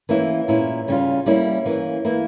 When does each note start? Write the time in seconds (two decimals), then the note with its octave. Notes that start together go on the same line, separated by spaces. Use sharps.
0.09 E3 A#3 C#4 E4
0.48 A#2 G#3 C#4 E4
0.88 C#3 G3 C#4 F4
1.26 G3 A#3 C#4 E4
1.66 E3 A#3 C#4
2.05 E3 A#3 E4